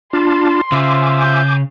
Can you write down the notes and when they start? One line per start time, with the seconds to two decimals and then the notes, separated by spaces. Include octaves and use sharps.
0.13 D4 F4 A5 B5 C6
0.72 C#3 F4 C5 E5 G#5 D6
1.21 G6